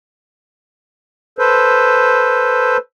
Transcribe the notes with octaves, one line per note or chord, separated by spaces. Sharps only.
A4 B4 C5